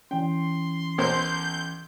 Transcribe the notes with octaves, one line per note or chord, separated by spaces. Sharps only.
E3 C#4 G5 C6
B1 A#4 C5 G6